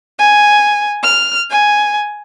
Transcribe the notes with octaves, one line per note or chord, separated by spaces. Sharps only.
G#5
F6
G#5